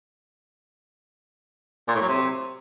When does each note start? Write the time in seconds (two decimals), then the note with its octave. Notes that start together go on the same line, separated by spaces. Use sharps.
1.88 A#2
1.95 A2
2.02 F#3
2.08 C3